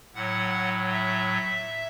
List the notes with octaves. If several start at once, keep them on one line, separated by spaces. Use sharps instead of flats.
A2 F#3 F#5
E5